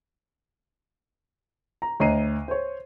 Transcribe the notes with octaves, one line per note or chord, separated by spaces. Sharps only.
A#5
D2 C#5 D#5 A#5 C7 D#7
C5 C#5